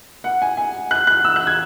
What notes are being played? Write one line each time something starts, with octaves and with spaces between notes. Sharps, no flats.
F#5
G#5
G#5
F#6
F#6
E6
F#6
G#6